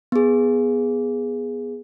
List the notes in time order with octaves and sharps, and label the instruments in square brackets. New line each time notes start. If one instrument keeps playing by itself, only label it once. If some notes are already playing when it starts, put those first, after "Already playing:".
[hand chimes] B3 G#4